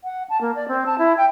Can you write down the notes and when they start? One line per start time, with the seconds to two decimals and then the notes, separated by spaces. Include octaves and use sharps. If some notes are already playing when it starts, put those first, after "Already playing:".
0.04 F#5
0.29 A5
0.41 A#3
0.55 D5
0.68 C4
0.86 A5
0.98 E4
1.17 G5